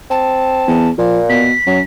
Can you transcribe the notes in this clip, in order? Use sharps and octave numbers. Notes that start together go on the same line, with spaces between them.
C4 A5
E2
A#2 F3
B2 B6
F#2 F#3